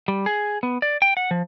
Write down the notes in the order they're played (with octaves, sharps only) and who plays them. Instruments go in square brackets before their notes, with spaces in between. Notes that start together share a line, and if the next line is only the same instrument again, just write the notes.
[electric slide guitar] G3
G#4
B3
D5
G5
F#5
F3